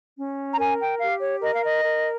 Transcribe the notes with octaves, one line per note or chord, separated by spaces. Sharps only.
C#4
A#5
A#4 G#5
G5
G4 F5
C#5
A#4 D#5
F5
D#5
A#4